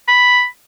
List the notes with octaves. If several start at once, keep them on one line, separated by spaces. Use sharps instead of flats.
B5